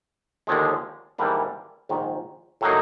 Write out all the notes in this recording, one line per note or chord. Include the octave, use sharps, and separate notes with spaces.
D#2 D3 F3 G#3
G#2 E3 G3 A#3 D4
A#1 G#2 D#3
A2 F#3 A#3 D#4